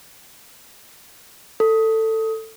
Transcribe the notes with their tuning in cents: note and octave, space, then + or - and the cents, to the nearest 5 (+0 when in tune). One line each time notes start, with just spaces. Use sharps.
A4 +15